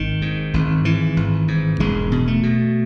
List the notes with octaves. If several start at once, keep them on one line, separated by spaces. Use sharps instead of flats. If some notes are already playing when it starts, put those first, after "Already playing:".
Already playing: G#1 D#3
G#2
G#1
G#2 E3
G#1
G#2
E1 G#3
B2
A3
B2